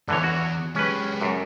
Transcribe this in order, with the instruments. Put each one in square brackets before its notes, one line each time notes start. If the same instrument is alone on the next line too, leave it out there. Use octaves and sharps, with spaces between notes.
[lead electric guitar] E2 G2 [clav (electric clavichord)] D3 E3 C#5
[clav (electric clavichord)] F#4
[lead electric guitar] G#3 G4 [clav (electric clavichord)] C#4 B4
[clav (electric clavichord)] F#2